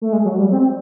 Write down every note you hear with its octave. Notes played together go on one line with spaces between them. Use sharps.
A3
G#3
F#3
G3
C4